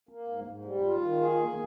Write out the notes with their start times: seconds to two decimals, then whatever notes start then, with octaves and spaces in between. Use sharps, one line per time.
0.09 A#3
0.28 G#2
0.47 G#2
0.65 G3
0.84 F4
1.02 D#3
1.21 G#4
1.39 A#3